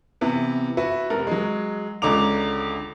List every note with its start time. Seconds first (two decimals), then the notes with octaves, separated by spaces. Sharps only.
0.21 C3 E3 B3
0.77 E4 F#4 B4
1.10 F1 A#4
1.27 F#3 G#3
2.02 C#2 D3 C#4 A#5 D6 F7